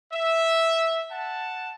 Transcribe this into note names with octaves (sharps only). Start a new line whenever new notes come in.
E5
F#5 A5